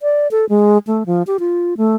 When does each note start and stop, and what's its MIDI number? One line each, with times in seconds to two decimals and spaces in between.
0.01 0.28 74
0.31 0.45 69
0.49 0.78 56
0.87 1.04 57
1.06 1.23 53
1.27 1.37 67
1.40 1.74 65
1.77 1.96 57